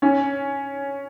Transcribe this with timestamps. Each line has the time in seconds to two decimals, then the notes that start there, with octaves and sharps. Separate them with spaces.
0.02 C#4